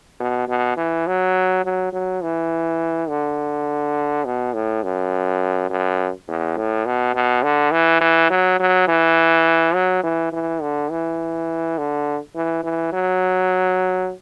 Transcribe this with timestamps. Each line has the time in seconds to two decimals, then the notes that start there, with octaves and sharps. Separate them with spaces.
0.20 B2
0.48 B2
0.77 E3
1.07 F#3
1.65 F#3
1.93 F#3
2.23 E3
3.09 D3
4.25 B2
4.54 A2
4.83 F#2
5.70 F#2
6.28 E2
6.57 A2
6.86 B2
7.15 B2
7.43 D3
7.72 E3
8.01 E3
8.30 F#3
8.60 F#3
8.88 E3
9.74 F#3
10.03 E3
10.33 E3
10.62 D3
10.91 E3
11.78 D3
12.35 E3
12.64 E3
12.93 F#3